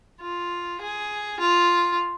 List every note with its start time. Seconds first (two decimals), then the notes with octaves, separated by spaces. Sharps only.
0.21 F4
0.81 G#4
1.40 F4